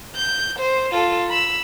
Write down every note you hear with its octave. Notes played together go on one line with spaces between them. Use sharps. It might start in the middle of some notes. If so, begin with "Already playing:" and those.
G6
C5
F4 A4
B5 E6